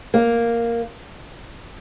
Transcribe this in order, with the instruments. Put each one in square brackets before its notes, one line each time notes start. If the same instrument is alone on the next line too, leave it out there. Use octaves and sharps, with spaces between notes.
[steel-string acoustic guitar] A#3